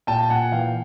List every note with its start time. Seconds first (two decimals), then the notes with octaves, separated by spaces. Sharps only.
0.07 A#2 G5 A5
0.23 A5
0.30 A#2 F#5 G#5
0.52 E3 F5 G5